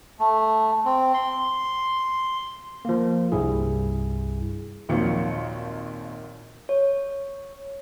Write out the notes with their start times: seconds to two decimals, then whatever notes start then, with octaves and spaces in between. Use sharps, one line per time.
0.19 A3
0.85 C4
1.14 C6
2.85 F3 A#3
3.32 C2 G2 E4 G#4
4.89 G#1 D#2 A#2 F3 F#3 C#7
6.69 C#5